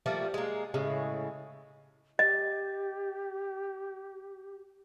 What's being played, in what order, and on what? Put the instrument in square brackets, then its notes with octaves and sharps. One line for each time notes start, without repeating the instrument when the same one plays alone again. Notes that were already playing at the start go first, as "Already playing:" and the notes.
[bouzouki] F3 G3 A3 A#3
G#3 A#3
A2 C#3 G#3
[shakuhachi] G4 [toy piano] D#5